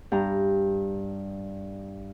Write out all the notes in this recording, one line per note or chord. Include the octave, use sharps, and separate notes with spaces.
G2 A#5